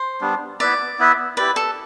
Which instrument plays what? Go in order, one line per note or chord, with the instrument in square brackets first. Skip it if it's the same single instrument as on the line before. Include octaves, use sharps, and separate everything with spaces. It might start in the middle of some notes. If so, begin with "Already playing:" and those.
Already playing: [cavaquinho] C5
[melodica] G3 B3 D4
[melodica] B3 E4 B4 E5 [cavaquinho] D5
[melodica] B3 E4 B4 E5
[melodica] E4 G4 D5 [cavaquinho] B4
[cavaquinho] A4